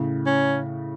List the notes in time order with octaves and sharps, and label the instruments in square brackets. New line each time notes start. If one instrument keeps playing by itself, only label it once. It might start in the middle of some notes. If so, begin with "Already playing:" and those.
Already playing: [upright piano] A2 C#3
[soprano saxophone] C#4